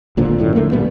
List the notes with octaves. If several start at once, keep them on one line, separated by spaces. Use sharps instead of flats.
G#1 A#2 D3 F3
F#2 A2 D3
F2 D3 A3 A#3
A1 A#2 G3 B3